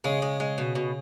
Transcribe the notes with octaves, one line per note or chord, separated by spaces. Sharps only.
C#3 G#3
G#3
G#3
B2
B2